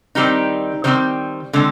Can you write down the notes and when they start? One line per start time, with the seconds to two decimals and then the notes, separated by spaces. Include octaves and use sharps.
0.15 D#3 G3 C4 D#4
0.84 D#3 G3 C4 C5
1.53 D3 G#3 C4